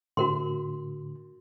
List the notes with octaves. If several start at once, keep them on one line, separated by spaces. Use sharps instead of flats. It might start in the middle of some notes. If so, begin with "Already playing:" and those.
A2 D3 F#4 A#4 C6